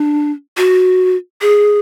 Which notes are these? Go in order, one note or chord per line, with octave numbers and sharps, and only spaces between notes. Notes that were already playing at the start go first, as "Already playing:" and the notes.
Already playing: D4
F#4
G#4